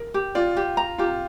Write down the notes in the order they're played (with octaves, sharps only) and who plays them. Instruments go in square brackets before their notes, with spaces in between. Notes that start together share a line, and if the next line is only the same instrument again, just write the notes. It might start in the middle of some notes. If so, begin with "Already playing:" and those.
Already playing: [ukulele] A#4
G4
[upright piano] F4 [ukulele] D5
[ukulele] G4
A#5
[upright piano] F4 [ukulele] G4